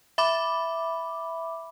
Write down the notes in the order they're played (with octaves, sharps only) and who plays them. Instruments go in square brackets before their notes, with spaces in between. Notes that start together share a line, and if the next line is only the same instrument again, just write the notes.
[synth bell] E5 B5 D6